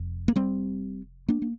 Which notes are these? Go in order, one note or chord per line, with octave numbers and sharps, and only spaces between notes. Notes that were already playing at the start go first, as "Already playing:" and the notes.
Already playing: F1 F2
A#3
G3 C4
A#3 D4
A#3